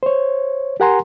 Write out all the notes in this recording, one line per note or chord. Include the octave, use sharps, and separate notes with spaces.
C5 C#5
G4 A#4 F#5 G#5 A#5 C6